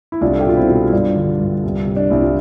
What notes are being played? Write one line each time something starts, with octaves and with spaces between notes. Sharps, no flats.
E4
C2 D4 F4
A4
G4
B2 F4
C4 E4
B2
E4
G2 D4 F4
D3
G2
C2
C3
D4
C2 E4
F4